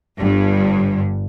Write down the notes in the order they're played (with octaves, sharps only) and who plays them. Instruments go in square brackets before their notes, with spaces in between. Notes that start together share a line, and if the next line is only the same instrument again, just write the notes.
[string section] G1 G2